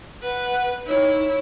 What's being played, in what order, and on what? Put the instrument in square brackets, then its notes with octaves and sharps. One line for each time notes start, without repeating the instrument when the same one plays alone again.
[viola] B4 [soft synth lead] F#5
[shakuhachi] D#4 [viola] E4 [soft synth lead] C#5